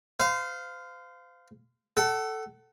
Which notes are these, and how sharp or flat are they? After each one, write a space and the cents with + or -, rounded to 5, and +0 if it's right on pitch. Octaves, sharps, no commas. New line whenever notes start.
C5 -35 F5 +0
A4 +0 F#5 +35